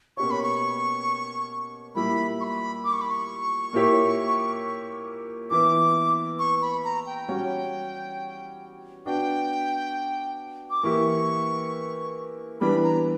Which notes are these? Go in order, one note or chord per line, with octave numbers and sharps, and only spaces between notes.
B2 A#3 C#4 G4 C#5 C#6
B5
C#6
A#2 G3 A#3 E4 G4 B5
C#6
B5
D6
C#6
B5
C#6
A#2 A#3 E4 G4 C#5
E3 B3 E4 D6
C#6
B5
A#5
G5
G3 C#4 F#4 C#5
B3 D4 F#4 G5
D6
E3 A#3 E4 G4 C#6
E3 G3 B3 D4 B5
A#5